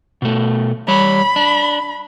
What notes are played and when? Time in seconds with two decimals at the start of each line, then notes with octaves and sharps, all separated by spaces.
0.22 B2 A3
0.88 G3 C#5 B5
1.36 D4